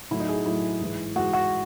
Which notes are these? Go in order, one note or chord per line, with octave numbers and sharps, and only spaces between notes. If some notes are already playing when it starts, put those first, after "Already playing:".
A2 F#3 A3 E4
D#4
G#4
A2 F#3 A3 E4
G#2 E3 G#3
G#2 E3 G#3 F#4
F#4